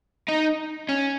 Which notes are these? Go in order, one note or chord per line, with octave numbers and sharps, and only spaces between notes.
D#4
C#4